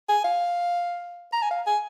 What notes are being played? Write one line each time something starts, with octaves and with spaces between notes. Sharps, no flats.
G#5
F5
A#5
G#5
F5
G#5